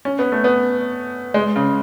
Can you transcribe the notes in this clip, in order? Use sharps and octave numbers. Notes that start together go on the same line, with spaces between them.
C#4
B3
A3
B3
G#3
C#3